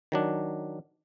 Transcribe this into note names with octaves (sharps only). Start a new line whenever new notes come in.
D#3 F#3 D4